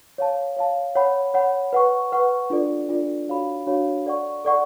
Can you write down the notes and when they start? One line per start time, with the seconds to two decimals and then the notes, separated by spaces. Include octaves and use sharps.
0.18 C#5 F5 A5
0.56 C#5 F5 A5
0.95 C#5 F#5 B5
1.34 C#5 F#5 B5
1.73 B4 F#5 C#6
2.12 B4 F#5 C#6
2.50 D4 F4 A4 D5
2.89 D4 F4 A4 D5
3.28 D4 F#4 C#5 F5 B5
3.67 D4 F#4 C#5 F5 B5
4.06 A4 D5 F#5 C#6
4.44 A4 D5 F#5 C#6